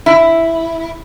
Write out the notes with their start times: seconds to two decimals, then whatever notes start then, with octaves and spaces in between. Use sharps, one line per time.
0.06 E4